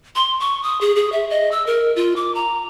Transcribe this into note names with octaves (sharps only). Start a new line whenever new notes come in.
C6
C#6
D#6
G#4
G#4
E5
D#5
E6
A#4
F4
D6
A#5